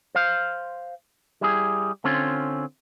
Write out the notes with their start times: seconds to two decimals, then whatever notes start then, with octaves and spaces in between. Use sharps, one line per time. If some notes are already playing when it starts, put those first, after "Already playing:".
0.15 C5 F5
1.41 G3 E4 G#4
2.04 D3 C4 C#4 F4